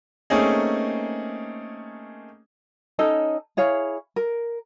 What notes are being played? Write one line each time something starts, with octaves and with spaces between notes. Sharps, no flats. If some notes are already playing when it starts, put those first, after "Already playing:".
A3 A#3 C4 C#4 D#4 G#4
C#4 D#4 A4 D#5
E4 G#4 C#5 F5
A#4